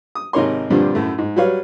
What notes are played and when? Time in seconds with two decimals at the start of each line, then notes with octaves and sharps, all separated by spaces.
0.15 D#6
0.33 G#1 C3 D#4 A#4 C#5 C6
0.70 G2 A#2 D3 F3 G3 C4
0.95 F#2 A2 A3
1.18 G#2
1.36 F#3 G3 B4 C#5 F5